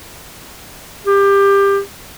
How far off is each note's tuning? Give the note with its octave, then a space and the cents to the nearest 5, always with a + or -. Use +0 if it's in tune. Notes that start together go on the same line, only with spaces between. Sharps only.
G4 +20